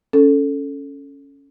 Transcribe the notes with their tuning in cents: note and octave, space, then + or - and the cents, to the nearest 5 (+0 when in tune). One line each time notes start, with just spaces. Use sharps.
C#4 +5 A4 +0